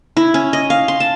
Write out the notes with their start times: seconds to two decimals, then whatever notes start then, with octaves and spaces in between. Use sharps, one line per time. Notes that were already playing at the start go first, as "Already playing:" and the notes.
0.17 E4
0.34 C#4
0.53 D#5
0.70 F5
0.88 C6
1.00 A5